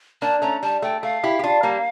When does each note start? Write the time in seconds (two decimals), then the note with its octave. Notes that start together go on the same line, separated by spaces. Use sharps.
0.22 A#3 D4 A5
0.42 A3 C#4 A#5
0.63 G3 A5
0.82 A3 G5
1.03 A3 F5
1.23 E4 G4
1.39 G4
1.43 D4 F4
1.63 G3 A#3